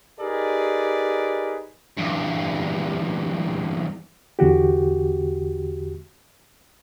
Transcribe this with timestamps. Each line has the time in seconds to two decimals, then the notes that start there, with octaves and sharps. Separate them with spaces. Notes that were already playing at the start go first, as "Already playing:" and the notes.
0.20 D#4 G4 G#4 A#4 B4 D5
1.97 E2 G2
4.39 E2 D3 F#4 G4